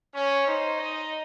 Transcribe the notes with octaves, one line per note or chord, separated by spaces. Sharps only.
C#4 C#5
D#4 C5
D#5